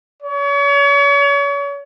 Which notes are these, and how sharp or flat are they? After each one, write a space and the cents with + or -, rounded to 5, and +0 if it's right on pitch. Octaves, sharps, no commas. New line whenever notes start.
C#5 +35